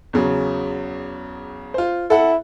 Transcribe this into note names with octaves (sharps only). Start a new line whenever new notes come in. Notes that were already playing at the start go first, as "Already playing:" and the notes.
E2 C#3 F#3
F4 C5
E4 A4 F#5